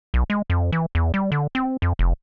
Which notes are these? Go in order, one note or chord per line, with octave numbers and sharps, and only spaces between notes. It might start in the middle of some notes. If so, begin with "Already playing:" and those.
B1
G#3
F2
E3
E2
G3
D3
C4
F2
F1